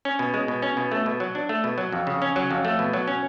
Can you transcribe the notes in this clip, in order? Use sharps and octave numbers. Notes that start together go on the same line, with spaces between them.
C#4
B2
G#3
B2
C#4
B2
A3
B2
F#3
D4
A3
B2
F#3
F2
C#3
C#4
F#3
F2
A3
B2
F#3
C#4